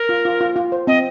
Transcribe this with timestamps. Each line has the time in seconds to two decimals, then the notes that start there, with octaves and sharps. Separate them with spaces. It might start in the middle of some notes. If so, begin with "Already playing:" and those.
Already playing: A#4
0.09 F4
0.25 F4
0.41 F4
0.56 F4
0.72 C5
0.87 C4 D#5